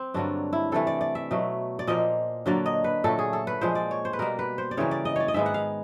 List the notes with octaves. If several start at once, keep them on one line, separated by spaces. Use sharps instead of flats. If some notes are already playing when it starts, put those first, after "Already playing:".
Already playing: C4
G2 D3 F#3 A#3 D4
E4
C3 E3 A3 A4
D5
D5
E5
B2 F#3 A3
D5
A#2 F3 A#3 D#5
D3 F#3 A#3 D5
D#5
B4
A#2 F#3 A3 A4
G#4
A4
B4
A#2 F3 G#3 C5
D5
C#5
C5
B4
B2 G3 A#3 A#4
B4
C5
D5
C#3 E3 G3 A#3 C#5
D5
D#5
C#5 D5
D#5
G#2 D#3 G#3 B3 E5
F#5
F5